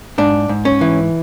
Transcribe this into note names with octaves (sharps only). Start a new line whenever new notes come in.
G#2 D4
G#2
C#4
E3